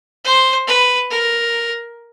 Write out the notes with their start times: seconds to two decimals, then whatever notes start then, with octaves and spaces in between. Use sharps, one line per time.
0.25 C5
0.67 B4
1.10 A#4